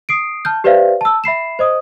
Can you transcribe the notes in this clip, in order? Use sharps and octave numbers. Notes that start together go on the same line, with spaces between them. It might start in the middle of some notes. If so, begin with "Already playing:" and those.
D#6 C7 D7
A5 F6 G6
G4 B4 C5 D5 E5 F5
A5 E6
E5 B5 C7 E7
C5 D#5 D#6